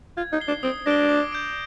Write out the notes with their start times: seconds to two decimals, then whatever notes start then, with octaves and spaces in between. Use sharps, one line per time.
0.17 F4 G#6
0.33 D#4
0.40 C7 G7
0.48 D4
0.63 C4 D#6
0.86 D4 A#6 D7 G7
1.09 D6
1.32 G6 D7